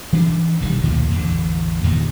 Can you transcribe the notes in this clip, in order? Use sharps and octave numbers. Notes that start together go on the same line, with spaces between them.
E3 C#4 D4
D#1 B1 D#3 G3
D2 A#2 D#3 F3
A1 E2 D3
E2 G2 A#2 D#3